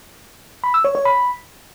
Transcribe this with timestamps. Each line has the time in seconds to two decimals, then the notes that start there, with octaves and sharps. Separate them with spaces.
0.64 B5
0.74 E6
0.84 C#5
0.95 C#5
1.05 B5